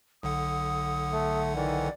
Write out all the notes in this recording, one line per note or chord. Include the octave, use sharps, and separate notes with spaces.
B1 D3 F#5 D#6
A3
D#3 E3 D5